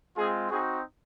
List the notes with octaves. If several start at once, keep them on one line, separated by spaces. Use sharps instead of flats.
G#3 C4 F4 G#4
C4 D#4 F#4 G#4